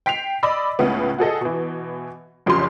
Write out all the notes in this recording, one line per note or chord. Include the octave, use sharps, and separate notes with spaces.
G5 B6 C7 F7
D5 D#5 B5 D6 E6
C#2 A2 C#3 B3
F#4 G#4 A4 D#5
B2 E3
F#1 F2 C#3 G4 C6